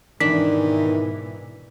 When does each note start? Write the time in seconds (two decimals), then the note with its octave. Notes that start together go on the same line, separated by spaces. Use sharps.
0.20 G#2 B2 D#3 E3 D4 B6